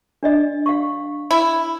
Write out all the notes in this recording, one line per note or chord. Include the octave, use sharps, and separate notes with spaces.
D4 D5 D#5
F5 C#6
E4